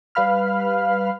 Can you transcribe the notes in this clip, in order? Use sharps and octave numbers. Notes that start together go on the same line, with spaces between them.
G3 B4 F5 B5 F6